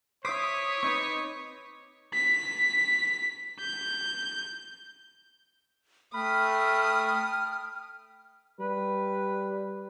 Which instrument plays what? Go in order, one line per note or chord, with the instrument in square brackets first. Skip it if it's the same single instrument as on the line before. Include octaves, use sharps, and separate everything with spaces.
[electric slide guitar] E4 C5 [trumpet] C#5 [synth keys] D6 D#6 B6
[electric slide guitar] C4 D#4 B4 [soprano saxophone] C#6
[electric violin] B6
G6
[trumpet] A3 [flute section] G5 F6 [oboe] B5 [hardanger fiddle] D#6
[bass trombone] G3 [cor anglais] B4